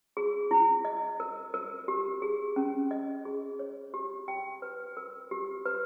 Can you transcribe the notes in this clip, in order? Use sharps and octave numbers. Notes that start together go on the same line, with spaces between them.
G#4
E4
D#5
A#4
A#4
G4
G#4
C#4
D#5
G#4
C#5
G4
G5
B4
A#4
G4
B4